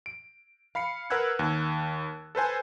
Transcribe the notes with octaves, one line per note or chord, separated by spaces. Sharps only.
D7
F5 B5 C7 C#7
A#4 B4 F#5 E6 F#6 G#6
D#2
A4 B4 C5 G#5